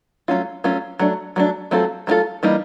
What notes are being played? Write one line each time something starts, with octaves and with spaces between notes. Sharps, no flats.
F#3 A3 C#4 F4
F#3 A3 C#4 F4
F#3 A3 D4
F#3 A3 D4
F#3 A3 C4 F4 A4
F#3 A3 C4 F4 A4
E3 G3 A#3 D#4